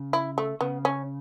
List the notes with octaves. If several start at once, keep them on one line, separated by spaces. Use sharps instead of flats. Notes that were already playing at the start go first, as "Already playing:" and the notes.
Already playing: C#3
E4
A3
C#3 B3
C#4